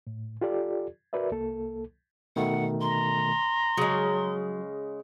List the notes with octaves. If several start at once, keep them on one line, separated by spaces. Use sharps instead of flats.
A2
F4 G4 A4 D5
F#4 A#4 B4 D5 E5
C2 A#3 A4
B2 D#3 A3 F#5
A#5 C6
C#3 F#3 G#3